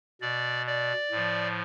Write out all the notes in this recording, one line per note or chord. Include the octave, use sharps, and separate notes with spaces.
B2 D5
D5
A2 F3